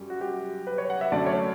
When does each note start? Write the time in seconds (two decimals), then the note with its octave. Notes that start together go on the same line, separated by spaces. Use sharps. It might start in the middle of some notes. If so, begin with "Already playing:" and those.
Already playing: F#2 G3
0.10 F#4
0.21 G4
0.67 B4
0.78 C#5
0.90 F#5
1.01 E5
1.12 F#2 D3 A3 D5
1.26 C#5